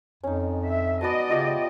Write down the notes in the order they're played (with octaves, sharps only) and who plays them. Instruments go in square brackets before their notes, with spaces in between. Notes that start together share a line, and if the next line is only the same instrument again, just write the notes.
[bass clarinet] F2 [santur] C#4 D#4
[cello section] E5
[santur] B3 F#4 A5 [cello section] D5 D#5
[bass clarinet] C#3 [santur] F4 G4 E5